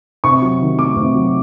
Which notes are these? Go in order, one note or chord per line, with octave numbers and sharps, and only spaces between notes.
C3 C#6
F#3
D#3
A3 D6
C3
F#3